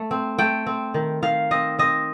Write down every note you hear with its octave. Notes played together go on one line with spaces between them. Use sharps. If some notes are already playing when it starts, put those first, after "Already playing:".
Already playing: A3
C4
A3 G5
C4
D#3
D#3 F5
C4 D#5
C4 D#5